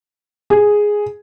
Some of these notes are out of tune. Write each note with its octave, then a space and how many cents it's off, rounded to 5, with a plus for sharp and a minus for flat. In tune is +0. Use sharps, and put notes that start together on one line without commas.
G#4 +0